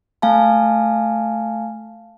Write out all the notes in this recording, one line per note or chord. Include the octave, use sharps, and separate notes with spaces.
A3 F5 G#5 A5